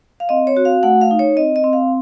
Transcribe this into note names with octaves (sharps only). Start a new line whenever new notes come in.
F5
C4 D#5
C#5
F#4
F5
A3 F#5
F5
D#4
C#5
C4 D#5
D#5
C4
F5